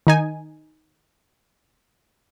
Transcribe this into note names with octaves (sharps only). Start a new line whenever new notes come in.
D#3 D#4 G#5